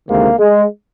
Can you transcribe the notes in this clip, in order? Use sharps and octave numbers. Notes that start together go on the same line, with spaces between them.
D2 C3 D#3 G#3 A#3
G#3